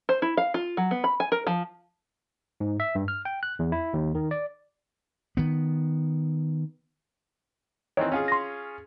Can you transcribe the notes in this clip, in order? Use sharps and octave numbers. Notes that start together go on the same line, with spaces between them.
C5
E4
F5
F4
F#3
B3
B5
G#5
A#4
F3
G#2
E5
G2
F6
G5
F#6
E2
E4
D#2
D#3
D5
D#3 B3
D#3 E3 C4 C#5 D#5
C#4 F4 G#4
C6 A#6